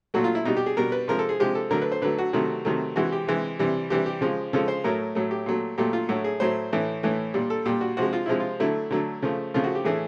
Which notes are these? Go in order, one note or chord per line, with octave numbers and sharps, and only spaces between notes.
A#2 F#3 A3 F#4
F4
E4
B2 G3 D#4
G4
G#4
B2 G3 A#4
B4
C3 F3 G#3 A#4
A4
G#4
C3 F3 G#3 G4
A4
D3 F#3 A3 A#4
B4
C5
D3 F#3 A3 B4
F#4
C3 D#3 F#3 A3
C3 D#3 F#3 A3
C3 E3 G#3 F#4
G4
C3 E3 G#3
C3 E3 G3
C3 E3 G3 G4
G4
C#3 F3 G#3
C#3 F3 G#3 A4
C5
A2 F#3 A3 A#4
A2 F#3 A3
G4
A#2 F#3 A3
A#2 F#3 A3 G4
F4
A2 F#3 A3 F#4
G#4
A2 F#3 A3 C5
A2 E3 A3
A2 E3 A3
A#2 G3
A4
A#2 G3 G4
F#4
C3 F3 G#3 F#4
F4
C3 F3 G#3 E4
F4
D3 F#3 A3 E4
D3 F#3 A3
C#3 F3 A3
C#3 F3 A3 F4
F#4
G4
A2 E3 A3 G#4